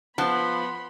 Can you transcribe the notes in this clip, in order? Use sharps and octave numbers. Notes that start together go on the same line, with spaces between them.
F3 B3 F#5 A5 B5 C6 F#6